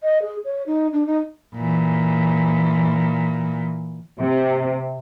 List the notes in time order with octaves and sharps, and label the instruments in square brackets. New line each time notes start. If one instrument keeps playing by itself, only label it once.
[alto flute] D#5
G#4
C#5
D#4
D4
D#4
[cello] A#2 E3
[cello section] C3